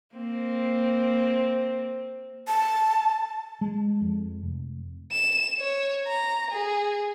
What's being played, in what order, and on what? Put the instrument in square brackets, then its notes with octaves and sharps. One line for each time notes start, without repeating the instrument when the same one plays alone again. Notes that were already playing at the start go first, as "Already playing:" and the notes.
[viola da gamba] A#3 C4
[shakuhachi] A5
[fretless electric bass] G#3
F2
F1
[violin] E7
C#5
A#5
G#4